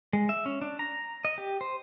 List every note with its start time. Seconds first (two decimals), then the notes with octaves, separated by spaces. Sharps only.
0.13 G#3
0.29 E5
0.46 C#4
0.62 D4
0.79 A#5
1.25 D#5
1.38 G4
1.61 C5